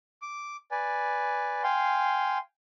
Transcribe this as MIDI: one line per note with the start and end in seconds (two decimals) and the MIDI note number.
0.22 0.56 86
0.71 1.63 71
0.71 1.63 74
0.71 1.63 80
1.64 2.38 77
1.64 2.38 79
1.64 2.38 80
1.64 2.38 84